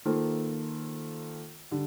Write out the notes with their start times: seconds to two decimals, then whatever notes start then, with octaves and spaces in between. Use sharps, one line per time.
0.05 D#3 A#3 F4 A4 C5
1.71 D3 G3